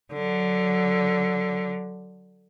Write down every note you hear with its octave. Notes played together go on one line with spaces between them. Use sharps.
D3 F#3